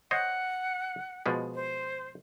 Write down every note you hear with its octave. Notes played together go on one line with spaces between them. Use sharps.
C5 C#5 D#5 F#5
B2 F3 G#3
C5